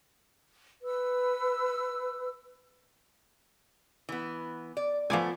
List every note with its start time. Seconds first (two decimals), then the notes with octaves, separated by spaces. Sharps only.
0.83 B4 E6
4.09 E3 B3
4.77 D5
5.10 F3 A3 B3 D5 G#5